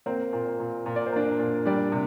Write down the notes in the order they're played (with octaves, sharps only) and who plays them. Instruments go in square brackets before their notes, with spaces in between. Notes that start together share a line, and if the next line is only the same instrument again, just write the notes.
[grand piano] A#3 C4 C5
A#2
A#2
A#2
D5
C5
A#3 D4 D5
A#2
G3 D4 D5
C3